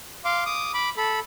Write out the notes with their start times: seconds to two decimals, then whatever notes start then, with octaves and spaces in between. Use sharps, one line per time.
0.25 F5 C6 D6
0.46 D6 D#6
0.74 B5 D6
0.97 A4 B5